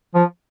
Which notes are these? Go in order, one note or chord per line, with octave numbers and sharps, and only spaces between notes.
F3